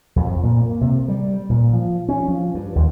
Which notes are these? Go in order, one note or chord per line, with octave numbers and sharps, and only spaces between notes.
F2
A#2
A#3
C3
G3
A#2
F3
C#4
F3
G2
D#2